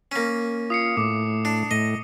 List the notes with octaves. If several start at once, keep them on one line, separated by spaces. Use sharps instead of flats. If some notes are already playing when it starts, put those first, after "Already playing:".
A#3 C#4
F4 D#6 C7 C#7
A2 D6
D4
A2 D#5